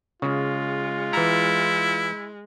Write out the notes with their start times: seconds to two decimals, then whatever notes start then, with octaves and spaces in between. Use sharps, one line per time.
0.22 C#3 G#3 F4
1.13 E3 E4 A#5